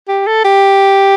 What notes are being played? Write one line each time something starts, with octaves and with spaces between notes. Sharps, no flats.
G4
A4
G4